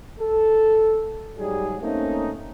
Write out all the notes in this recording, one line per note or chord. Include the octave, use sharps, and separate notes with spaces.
A4
G#2 F#3 G3 D#4 G#4
A3 A#3 C4 C#4 D#4